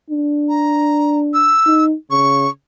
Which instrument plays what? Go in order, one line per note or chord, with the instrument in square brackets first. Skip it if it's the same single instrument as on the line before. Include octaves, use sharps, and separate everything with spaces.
[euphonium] D4
[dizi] A#5
E6
[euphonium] D#4
[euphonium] C#3 [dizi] C#6